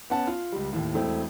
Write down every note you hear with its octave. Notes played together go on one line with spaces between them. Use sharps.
B3 C#4 F#5 A5
F4
C#2 G3
D#2 A2
E1 A3 C4 E4 G5